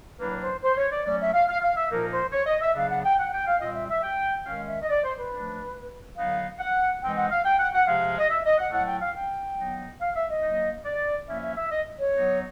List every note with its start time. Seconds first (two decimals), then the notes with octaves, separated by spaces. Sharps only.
0.19 A2 F#3 A#3 D4 B4
0.40 C5
0.63 C5
0.76 C#5
0.90 D5
1.05 F#3 A3 C#4 D5
1.20 E5
1.33 F5
1.48 F5
1.61 F5
1.76 E5
1.90 A#2 F3 A#3 D#4 A#4
2.11 C5
2.32 C#5
2.46 D#5
2.61 E5
2.75 C#3 F#3 B3 D4 F5
2.89 F#5
3.04 G5
3.18 F#5
3.32 G5
3.46 F5
3.60 A#2 G3 C4 D#5
3.74 E5
3.89 E5
4.02 G5
4.45 D#3 G#3 C#4 F5
4.66 E5
4.81 D#5
4.89 D5
5.02 C5
5.16 B4
5.31 F3 A3 D4
6.16 D3 F#3 B3 D#4 F5
6.58 F#5
7.01 E3 G#3 C4 D#4 G5
7.16 F#5
7.30 F5
7.44 G5
7.58 F#5
7.73 F#5
7.86 C3 F3 G#3 F5
8.18 D#5
8.29 E5
8.44 D#5
8.58 F#5
8.71 A2 F#3 A3 F#5
8.86 G5
9.00 F5
9.14 G5
9.57 F#3 B3 D#4
10.00 F5
10.14 E5
10.29 D#5
10.42 F#3 A#3 D#4
10.84 D5
11.27 F3 A#3 C#4 E4 E5
11.41 E5
11.55 E5
11.70 D#5
11.99 C#5
12.13 F#3 B3 D#4